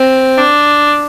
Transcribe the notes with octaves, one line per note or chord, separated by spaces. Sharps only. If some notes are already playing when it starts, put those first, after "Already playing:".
Already playing: C4
D4